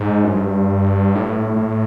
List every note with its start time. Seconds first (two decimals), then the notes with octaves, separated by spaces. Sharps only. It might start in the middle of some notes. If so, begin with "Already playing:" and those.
Already playing: G#2
0.24 F#2
0.33 G2
1.15 A2
1.56 A2